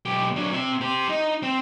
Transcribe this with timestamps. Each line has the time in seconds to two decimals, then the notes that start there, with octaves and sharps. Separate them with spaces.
0.05 B1 G4
0.36 F#3 D4
0.53 C4 E5
0.81 G4 C5
1.09 D#4
1.43 C4